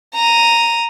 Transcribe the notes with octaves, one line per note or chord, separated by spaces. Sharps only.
A#5 D#7